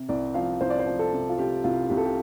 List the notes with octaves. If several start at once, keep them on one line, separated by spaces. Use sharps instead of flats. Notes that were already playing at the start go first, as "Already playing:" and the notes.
Already playing: C3
C2 D5
F3 F5
C2 C5
D5
C5
F3
A4
C3
F4
C3 G4
C2 F4
C2 G4
A4
G4